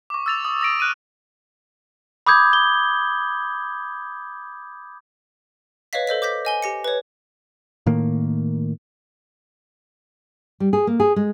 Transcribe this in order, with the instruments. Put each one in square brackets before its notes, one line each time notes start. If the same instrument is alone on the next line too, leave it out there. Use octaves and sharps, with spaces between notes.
[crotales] C#6 D6
E6 A6 F7
D#6
D#6 A#6 D7
F6 F#6 D#7
[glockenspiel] B5 D6 D#6 G6 G#6
G7
[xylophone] B4 C#5 D#5 F5 B6
A4 C5 D#5 B6
D6 G6 A#6 B6
D#5 G#5 G7
G4 A#6 C#7
B4 C#5
[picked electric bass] A2 D#3 A#3
[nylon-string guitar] G3
G#4
A#3
G#4
G#3